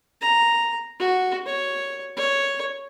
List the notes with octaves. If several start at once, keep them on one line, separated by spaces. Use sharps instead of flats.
A#5
F#4
C#5
C#5